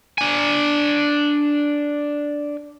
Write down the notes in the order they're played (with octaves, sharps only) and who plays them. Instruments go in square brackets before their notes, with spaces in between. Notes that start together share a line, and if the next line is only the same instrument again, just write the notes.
[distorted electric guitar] D4 G#5